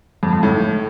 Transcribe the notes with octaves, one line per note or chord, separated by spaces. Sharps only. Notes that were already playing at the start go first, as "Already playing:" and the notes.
F2
F2
A2